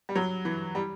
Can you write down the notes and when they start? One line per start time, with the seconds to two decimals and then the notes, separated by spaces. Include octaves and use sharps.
0.09 G3
0.15 F#3
0.45 E3
0.75 G3